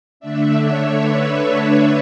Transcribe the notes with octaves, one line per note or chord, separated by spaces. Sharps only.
D3 A3 D4 E5
C#5
B4
C#5